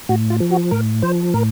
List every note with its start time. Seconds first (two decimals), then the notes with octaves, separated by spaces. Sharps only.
0.09 A2 F#4
0.30 F4
0.40 F3
0.51 F#4
0.71 A2 A#4
1.02 F3 C5
1.34 A2 A#4